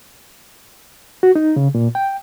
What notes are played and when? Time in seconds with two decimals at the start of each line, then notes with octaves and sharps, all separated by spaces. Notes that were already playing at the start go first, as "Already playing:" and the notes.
1.23 F#4
1.35 D#4
1.56 C#3
1.75 A#2
1.95 G5